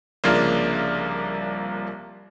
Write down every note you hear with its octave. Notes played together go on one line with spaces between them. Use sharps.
C2 C#3 F3 A#3 D4